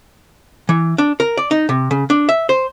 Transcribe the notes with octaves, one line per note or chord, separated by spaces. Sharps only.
E3
D4
A#4
D5
D#4
C3
C#3
D4
E5
C5